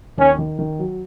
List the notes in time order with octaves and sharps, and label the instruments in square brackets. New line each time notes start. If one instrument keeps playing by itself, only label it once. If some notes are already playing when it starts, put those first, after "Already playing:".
[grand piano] D#2 [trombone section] C#4
[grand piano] D#3
D#3
F#3